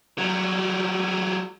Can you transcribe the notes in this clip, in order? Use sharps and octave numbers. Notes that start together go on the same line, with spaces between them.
F#3 G3